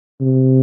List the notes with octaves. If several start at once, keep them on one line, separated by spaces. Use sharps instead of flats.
C3